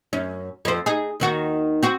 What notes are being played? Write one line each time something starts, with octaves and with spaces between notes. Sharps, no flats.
F#2 C#4
F2 C5
D#4 G#4
D#2 D#3 F#4
C4 F#4